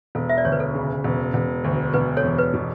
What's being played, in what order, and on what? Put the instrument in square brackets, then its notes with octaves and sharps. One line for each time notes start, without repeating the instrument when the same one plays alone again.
[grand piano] E1 [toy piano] A4
[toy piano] E5
D5
[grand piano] D2 [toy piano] C#5
[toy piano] B4
A4
[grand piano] C#3
E1
E1
D2
[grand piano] E1 [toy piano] B4
[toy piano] A4 C#5
[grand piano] E2
[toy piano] B4
[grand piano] B2